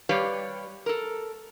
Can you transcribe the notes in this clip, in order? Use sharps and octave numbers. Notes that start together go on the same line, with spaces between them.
G3 G4 B4 C#5 D5 F5
A4 A#4